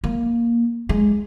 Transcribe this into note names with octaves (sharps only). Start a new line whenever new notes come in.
A#3
G#3